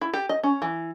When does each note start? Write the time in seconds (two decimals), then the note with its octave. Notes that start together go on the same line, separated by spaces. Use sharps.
0.01 E4
0.14 G4
0.29 D#5
0.43 C#4
0.62 E3